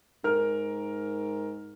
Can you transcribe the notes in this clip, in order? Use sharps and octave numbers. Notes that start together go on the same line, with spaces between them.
G#2 A#4 F6